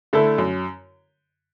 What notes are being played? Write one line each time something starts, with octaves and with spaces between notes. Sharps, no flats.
D3 A3 E4 A4
F#2